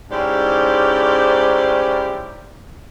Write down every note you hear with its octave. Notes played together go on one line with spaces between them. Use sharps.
G#2 C#4 E4 G4 C5 D5